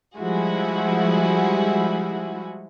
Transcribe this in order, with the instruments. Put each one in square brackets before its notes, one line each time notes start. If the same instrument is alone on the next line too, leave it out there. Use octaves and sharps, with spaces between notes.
[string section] F3 G3 G#3 E4 F#4 G#4